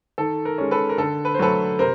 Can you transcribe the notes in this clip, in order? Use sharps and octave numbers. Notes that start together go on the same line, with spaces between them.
D#3 A4
A#4
G#3 C#4
A4 B4
A#4
D3 A4
B4
C5
F#3 A3 A4 B4
C3 A#4 C5